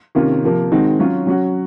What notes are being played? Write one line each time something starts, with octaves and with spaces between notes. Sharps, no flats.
C3 D#3 A#3 C#4 F4
C3 F3 A#3
D#3 G#3 C4 D#4 F#4
F#3 C#4 F4
F#3 C#4 F#4